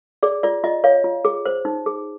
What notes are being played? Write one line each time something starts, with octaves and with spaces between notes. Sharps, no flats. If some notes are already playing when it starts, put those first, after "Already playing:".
G#4 D5
F4 D5
F4 D#5
C#5 F5
F4
G#4
C5
D#4
G#4